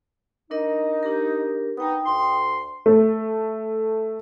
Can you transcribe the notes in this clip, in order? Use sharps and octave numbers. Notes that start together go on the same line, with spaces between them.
D4 D#4 A#4 D#5
D4 G4 A#4
B3 D#4 G5 D#6
D2 C6
A3